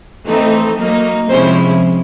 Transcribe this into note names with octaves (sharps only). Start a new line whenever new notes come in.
E3 A3 C4 D#4
F#3 A#3 D#4
C3 F3 G#3 C#4 E4 C5